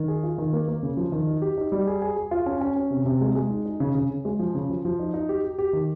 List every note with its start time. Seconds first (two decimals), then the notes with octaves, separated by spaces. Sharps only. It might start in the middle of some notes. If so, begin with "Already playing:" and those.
Already playing: D#3
0.08 G#4
0.23 F4
0.38 D#3
0.53 A#3
0.68 A#3
0.83 C#3
0.97 F3
1.12 D#3
1.27 D#4
1.42 G4
1.58 D#4
1.72 G3
1.87 G#4
2.02 G#4
2.16 G#4
2.31 F4
2.46 C#4
2.61 C#4
2.76 C#4
2.91 C3
3.05 C3
3.21 G#3
3.35 G#3
3.50 D#4
3.66 D#4
3.80 C#3
3.95 C#3
4.10 C#3
4.25 G#3
4.39 F3
4.55 C#3
4.69 F3
4.85 F3
4.99 D#4
5.14 D#4
5.29 G4
5.44 G4
5.59 G4
5.73 D#3